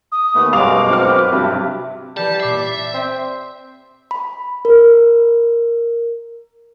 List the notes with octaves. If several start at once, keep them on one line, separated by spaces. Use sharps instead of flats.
D#6
D#2 A3 B3
F#2 B2 G3 G#3 F5 D6 F7
C4 F#4 F6
F#2 B4
G2 C3 F#3 E5
E3 G3 A5 G6
A#2 E5 D6 C7
D5
C4
B5
A#4